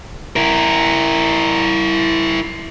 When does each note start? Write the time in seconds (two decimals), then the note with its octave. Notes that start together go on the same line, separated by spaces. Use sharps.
0.36 E4 A#4